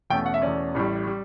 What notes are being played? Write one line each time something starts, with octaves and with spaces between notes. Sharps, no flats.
E2 B2 A3 C#4 G5
F#5
E5
E2 B2 A3 C#4 D5
A1 A2 G3
G3